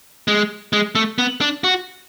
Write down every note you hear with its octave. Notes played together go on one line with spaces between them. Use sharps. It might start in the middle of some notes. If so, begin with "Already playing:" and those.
G#3
G#3
A3
B3
D4
F#4